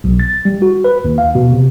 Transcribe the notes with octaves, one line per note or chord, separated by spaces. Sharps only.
B1
A6
G3
F#4
B4
D#2
F5
B2
C3